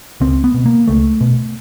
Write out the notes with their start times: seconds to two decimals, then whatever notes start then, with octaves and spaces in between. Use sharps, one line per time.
0.21 C#2 C4
0.44 B3
0.54 B2
0.66 A#3
0.88 C#2 A3
1.21 B2